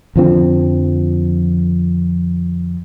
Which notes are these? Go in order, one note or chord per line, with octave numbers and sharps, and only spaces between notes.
F2 D3 F3 C4